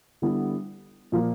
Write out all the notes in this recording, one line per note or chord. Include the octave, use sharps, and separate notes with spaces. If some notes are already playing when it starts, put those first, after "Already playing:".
D3 G3 B3 E4
A#2 F3 A#3